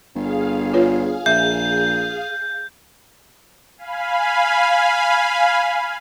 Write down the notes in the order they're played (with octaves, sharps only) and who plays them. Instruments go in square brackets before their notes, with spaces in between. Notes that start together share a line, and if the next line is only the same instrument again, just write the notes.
[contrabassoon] G1 [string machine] G#4 F5
[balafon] F4 B4 C#5
[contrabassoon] A#1 [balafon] E5 [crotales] G6
[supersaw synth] F5 G#5 B5